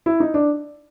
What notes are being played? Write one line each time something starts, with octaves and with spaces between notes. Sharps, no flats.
E4
D#4
D4